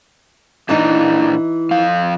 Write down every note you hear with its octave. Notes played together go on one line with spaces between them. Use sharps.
A#2 E3 D4 D#4 A#5
F2 F5